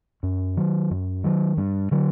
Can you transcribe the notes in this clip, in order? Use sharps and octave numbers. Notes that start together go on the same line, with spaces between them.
F#2
D#3 F#3
F#2
D#3 F#3
G2
D3 F#3